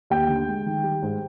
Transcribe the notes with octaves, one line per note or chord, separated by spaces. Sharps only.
D#2 G5
D3
G#3
D#3
G3
G#2